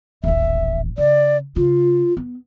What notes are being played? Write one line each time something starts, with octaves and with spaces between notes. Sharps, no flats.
D#1 A1 E5
C#3 D5
C#3 F4
B3